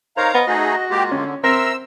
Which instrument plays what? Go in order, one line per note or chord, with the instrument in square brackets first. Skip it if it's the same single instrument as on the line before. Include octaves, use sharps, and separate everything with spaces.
[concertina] D#4 A#4 C#5 [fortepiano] C5 [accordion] F5 A#5
[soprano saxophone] B3 [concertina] D#5
[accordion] A3 D#4 G#4 [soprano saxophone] F#4
[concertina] G#3 A#3 F4 [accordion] G4
[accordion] D3 [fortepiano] C#4
[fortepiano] C4 [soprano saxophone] A#4 [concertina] E5 A#5 C6 [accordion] E6